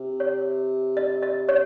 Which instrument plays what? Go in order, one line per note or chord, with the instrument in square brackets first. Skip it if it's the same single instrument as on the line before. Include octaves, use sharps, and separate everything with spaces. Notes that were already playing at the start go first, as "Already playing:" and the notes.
Already playing: [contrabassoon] C3
[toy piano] C#5
D#5
D#5
C#5